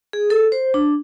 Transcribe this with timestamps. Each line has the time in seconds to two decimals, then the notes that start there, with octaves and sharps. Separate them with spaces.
0.13 G#4
0.30 A4
0.52 C5
0.74 D4